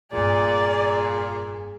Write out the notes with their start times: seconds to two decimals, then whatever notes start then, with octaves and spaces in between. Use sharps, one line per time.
0.13 F1 G2 A#2 G#4 D5